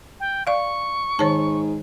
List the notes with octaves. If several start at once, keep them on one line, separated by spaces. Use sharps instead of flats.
G5
D5 F5 C#6
G#2 D#3 C#5 A5